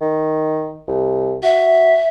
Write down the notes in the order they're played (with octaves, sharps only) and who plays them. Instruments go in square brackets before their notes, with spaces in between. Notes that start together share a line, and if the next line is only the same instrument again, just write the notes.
[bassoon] D#3
C2
[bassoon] F#4 [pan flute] E5